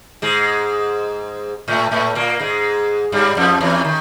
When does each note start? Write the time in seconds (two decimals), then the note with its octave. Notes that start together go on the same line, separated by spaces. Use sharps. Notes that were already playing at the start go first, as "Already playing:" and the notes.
0.22 G#2 G#3
1.68 A2 A3
1.91 A2 A3
2.15 A#2 A#3
2.40 G#2 G#3
3.12 G2 G3
3.37 F2 F3
3.61 E2 E3
3.85 D#3